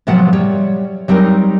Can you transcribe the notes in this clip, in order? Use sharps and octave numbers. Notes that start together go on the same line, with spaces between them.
A2 C3 F3 F#3 B3 F#5
G3 C#5
F#3 G3 C4 D#4 A#4